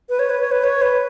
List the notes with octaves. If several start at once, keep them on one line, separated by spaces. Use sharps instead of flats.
B4
C#5
B4
C#5
B4
C#5
B4